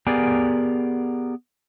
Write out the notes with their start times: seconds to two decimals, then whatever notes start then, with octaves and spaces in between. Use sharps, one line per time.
0.07 B3 G4 G#4 A#4 D5 G#5